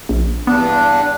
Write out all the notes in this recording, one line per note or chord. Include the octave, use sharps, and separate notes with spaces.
A#1
E2 G2 B3 D4